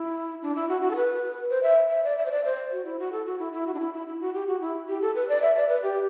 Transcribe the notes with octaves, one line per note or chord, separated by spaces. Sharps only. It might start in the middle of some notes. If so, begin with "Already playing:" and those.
Already playing: E4
D4
E4
F#4
F#4
A4
B4
C5
E5
E5
D5
E5
C5
D5
C5
F#4
E4
F#4
A4
F#4
E4
E4
F#4
D4
E4
E4
E4
F#4
G4
F#4
E4
G4
A4
B4
D5
E5
D5
B4
G4